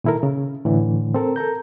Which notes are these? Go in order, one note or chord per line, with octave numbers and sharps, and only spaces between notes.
A#2 D#3 E4 A4 A#4
C#3
A2 D3 E3
C4 A4 A#4
A4 A#4 A#5 G6